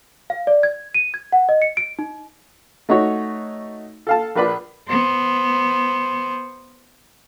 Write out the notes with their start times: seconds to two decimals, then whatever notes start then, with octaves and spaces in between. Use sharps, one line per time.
0.30 F5
0.47 D5
0.63 G#6
0.95 D#7
1.14 G#6
1.32 F#5
1.49 D#5
1.62 C#7
1.77 D7
1.99 D#4
2.89 A3 D#4 F#4 C#5
4.07 A4 F5 A5
4.35 A#1 A#3 B4 D5 B5
4.89 B3 C5